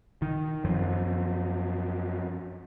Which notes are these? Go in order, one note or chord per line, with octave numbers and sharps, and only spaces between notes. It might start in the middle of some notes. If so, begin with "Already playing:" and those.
D#3
F#2 F3